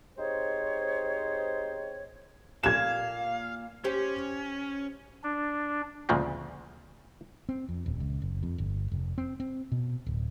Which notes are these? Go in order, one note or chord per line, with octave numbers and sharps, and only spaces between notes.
C4 D#4 G4 G#4 C5 C#5
A#2 F5 G#6 E7
C#4 G4 C5
D4
D2 A#2 C#3 F3 G#3 C4
C4
F2
D#1
C#2
F#1
F2
G1
F1
C4
C4
B2
D1